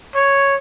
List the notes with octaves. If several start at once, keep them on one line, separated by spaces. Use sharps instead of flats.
C#5